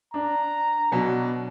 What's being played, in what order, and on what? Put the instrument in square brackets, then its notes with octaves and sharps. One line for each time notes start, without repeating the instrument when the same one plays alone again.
[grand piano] D4 [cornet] A#5
[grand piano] B2 F#3 [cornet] D4